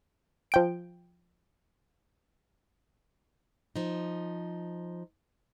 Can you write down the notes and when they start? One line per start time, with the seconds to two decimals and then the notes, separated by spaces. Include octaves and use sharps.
0.52 F3 G5 D7
3.76 F3 D#4